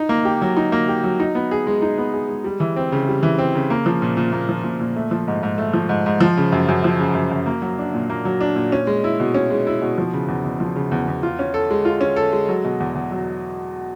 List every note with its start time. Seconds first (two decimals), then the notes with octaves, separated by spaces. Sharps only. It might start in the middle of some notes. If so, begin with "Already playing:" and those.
Already playing: D#4
0.09 A#3
0.25 G4
0.42 F#3
0.57 D#4
0.72 A#3
0.88 G4
1.04 F#3
1.20 D#4
1.35 B3
1.51 G#4
1.67 G#3
1.82 D#4
1.98 B3
2.13 G#4
2.29 G#3
2.44 G3
2.60 E3
2.76 C4
2.92 C#3
3.08 G3
3.23 E3
3.38 C4
3.55 C#3
3.70 A#3
3.86 F3
4.02 A#2
4.17 A#2
4.32 A#3
4.49 F3
4.64 A#2
4.81 A#2
4.96 A3
5.11 F3
5.28 G#2
5.43 G#2
5.58 A3
5.73 F3
5.89 G#2
6.06 G#2
6.21 F3
6.37 C#3
6.52 F#2
6.68 F#2
6.84 F3
6.99 C#3
7.15 F#2
7.31 F#2
7.46 A#3
7.62 F#3
7.79 D4
7.94 A#2
8.10 A#3
8.25 F#3
8.41 D4
8.56 A#2
8.72 C#4
8.87 G#3
9.04 E4
9.20 B2
9.34 C#4
9.50 G#3
9.67 E4
9.81 B2
9.98 F3
10.13 C#3
10.28 E2
10.44 E2
10.60 F3
10.76 C#3
10.91 E2
11.07 E2
11.23 F4
11.39 C#4
11.54 A4
11.70 G#3
11.85 F4
12.01 C#4
12.16 A4
12.33 G#3
12.49 F#3
12.64 B2
12.80 E2
12.95 E2
13.12 F#3